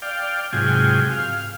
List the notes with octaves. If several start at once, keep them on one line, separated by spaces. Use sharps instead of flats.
D5 F5 G5
G#2 C3 F#3 F4 G5 G#5
F5